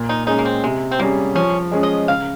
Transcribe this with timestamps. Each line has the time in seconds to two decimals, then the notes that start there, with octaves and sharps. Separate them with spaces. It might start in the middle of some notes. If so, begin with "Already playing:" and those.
Already playing: A#2
0.09 D#4
0.27 G#3 C#4 D#4 G#4
0.39 A#3
0.45 C4
0.64 C3 G#3
0.91 C4
0.99 G3 A#3 C#4 G#4
1.35 F3 C#4
1.72 G#3 C#4 G#4
1.83 D#5
2.08 C#3 F5